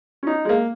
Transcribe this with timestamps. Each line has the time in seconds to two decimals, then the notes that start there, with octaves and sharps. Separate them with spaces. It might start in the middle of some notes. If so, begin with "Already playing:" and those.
0.23 C#4
0.27 D#4
0.45 G#3
0.49 A#3